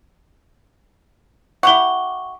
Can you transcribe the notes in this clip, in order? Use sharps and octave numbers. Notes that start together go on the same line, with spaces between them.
E4 G4 F#5 C#6 G7